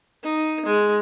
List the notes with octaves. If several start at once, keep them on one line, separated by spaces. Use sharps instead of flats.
D#4
G#3